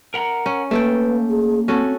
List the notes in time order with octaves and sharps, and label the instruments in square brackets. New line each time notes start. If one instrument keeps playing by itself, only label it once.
[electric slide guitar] A#4 F#5 A#5
[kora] C#4
[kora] A3 A4 G5 [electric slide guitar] A#3 [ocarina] B4
[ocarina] G#4
[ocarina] C4 [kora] C#4 F#4 A4